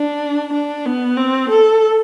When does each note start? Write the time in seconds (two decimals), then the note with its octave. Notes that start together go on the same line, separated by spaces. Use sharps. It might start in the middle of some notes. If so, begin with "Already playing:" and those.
Already playing: D4
0.53 D4
0.86 B3
1.17 C4
1.50 A4